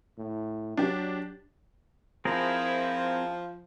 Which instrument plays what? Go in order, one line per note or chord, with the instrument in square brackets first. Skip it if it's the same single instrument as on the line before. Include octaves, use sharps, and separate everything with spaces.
[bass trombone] A2
[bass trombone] F#3 [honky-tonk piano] D4 G4
[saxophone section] F3 [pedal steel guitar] C4 G#4 A#4 [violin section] E4